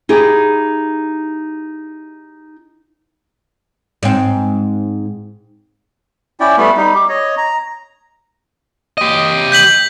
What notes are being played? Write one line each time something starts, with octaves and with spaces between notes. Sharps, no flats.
D#4 E4 G4 G#4
G#2 C4
C#4 E4 D5 G5
G3 A3 B3
G3 D#4
G4
C#5 D#5
A#5
G4 D#5
G6 B6 F#7